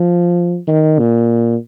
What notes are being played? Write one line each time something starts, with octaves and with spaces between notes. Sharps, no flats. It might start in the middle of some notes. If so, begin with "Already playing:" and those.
Already playing: F3
D#3
A#2